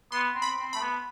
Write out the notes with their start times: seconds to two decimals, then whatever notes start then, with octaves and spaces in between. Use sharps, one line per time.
0.12 B3 C6
0.35 C4
0.42 B5
0.58 C4
0.73 A3 B5
0.81 B3